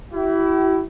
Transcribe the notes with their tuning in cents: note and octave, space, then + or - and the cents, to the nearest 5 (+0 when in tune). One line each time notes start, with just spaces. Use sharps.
E4 +5 G4 -45